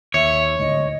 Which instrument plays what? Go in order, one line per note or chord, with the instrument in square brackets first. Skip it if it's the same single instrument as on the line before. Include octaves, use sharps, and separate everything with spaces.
[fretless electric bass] D#2 [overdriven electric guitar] C#5 [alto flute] E5
[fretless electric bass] D1 D2 G#2 [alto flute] D#5